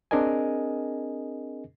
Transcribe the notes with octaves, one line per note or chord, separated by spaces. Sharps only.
C4 D4 G#4 A#4 D#5 G#5